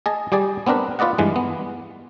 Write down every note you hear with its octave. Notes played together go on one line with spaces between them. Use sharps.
G#4 D#5 A5
G3 G4 G#4 D5
B3 C4 D4 A#4 B4
F4 B4 D5 D#5 F#5
G2 E3 G#3
B3